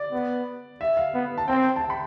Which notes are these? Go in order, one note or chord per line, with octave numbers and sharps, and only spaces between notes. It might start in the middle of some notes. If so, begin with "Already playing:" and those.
Already playing: D5
B3
E5
F5
B3
A5
C4 G5
A5
G5
B5